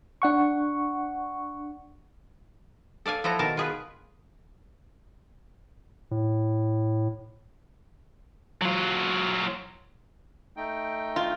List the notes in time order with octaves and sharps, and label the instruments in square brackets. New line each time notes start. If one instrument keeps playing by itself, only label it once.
[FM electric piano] D4 F#5 C#6
[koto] A4 D5 F5 G#5
F3 E4 A4 F#5 A#5
B2 D#3 A#4 A5
F4 G#4 B4
[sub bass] A2
[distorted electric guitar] F#3 F4
[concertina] A3 D#4 G5
[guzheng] F4